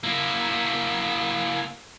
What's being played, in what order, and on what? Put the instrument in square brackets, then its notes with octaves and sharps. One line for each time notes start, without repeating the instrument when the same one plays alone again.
[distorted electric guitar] A#3 E4